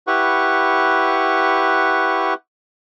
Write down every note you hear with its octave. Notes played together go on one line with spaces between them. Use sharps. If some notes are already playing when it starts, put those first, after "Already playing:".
E4 G4 B4 F#5 C#6